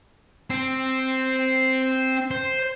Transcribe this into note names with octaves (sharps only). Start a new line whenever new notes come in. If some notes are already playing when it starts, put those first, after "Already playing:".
C4
C5